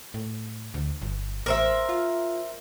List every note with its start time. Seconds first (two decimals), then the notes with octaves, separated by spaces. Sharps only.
0.14 A2
0.74 D2
1.02 G1
1.46 A1 A#4 C5 E5
1.89 F4